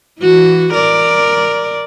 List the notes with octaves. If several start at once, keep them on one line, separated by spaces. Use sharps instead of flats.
E3 F#4
A#4 D5